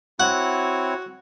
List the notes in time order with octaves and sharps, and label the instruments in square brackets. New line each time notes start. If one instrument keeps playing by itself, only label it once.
[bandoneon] C4 E4 C#5 [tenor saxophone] F#4 [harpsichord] F#5